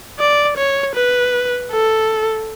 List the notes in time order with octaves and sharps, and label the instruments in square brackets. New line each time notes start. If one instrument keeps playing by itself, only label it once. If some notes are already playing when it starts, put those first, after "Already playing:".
[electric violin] D5
C#5
B4
A4